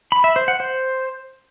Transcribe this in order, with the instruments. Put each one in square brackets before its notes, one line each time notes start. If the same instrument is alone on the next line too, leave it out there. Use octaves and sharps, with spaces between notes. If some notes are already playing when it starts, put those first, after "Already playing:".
[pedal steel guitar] B5
E5
C5
F#5
C5